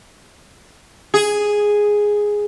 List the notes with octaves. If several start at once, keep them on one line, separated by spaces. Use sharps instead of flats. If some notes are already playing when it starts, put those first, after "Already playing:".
G#4